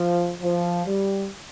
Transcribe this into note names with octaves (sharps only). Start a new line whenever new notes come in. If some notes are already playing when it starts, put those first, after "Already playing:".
Already playing: F3
F3
G3